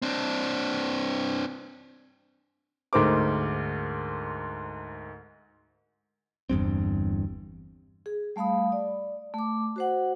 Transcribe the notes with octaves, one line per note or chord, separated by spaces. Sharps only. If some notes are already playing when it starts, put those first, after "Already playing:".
C4 D4
D2 G#2 A#4 C5 D6
G1 E2 G2 C4
G#4
G3 A3 F5 B5 D#6
D5
A3 D6
F#4 C5 F#5